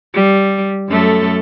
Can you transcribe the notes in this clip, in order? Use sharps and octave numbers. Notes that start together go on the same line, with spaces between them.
G3
F#2 A3 A4